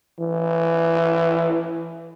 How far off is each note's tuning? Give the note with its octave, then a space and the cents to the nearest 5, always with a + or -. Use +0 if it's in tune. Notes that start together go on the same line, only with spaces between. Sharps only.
E3 +15